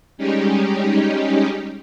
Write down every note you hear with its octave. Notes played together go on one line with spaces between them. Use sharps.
G3 G#3 C#4 D#4 G4